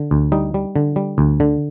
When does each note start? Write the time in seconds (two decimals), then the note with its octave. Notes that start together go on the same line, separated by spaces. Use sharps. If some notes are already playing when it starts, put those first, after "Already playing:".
Already playing: D3
0.11 D2
0.32 G3 D#4
0.54 G3
0.76 D3
0.96 G3
1.18 D2
1.40 D3